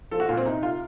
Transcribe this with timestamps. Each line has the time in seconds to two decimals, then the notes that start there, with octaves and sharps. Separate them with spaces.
0.11 F3 A4
0.20 F#4
0.29 A#2 F4
0.37 C4
0.45 C2 D#4
0.62 C2 F4